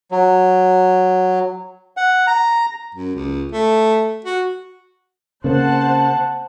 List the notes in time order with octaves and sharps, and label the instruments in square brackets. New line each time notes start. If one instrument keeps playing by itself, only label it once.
[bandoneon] F#3
F#5
A#5
[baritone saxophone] F#2
C#2
A3
F#4
[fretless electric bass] C#3 A#3 C4 [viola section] C5 F#5 A5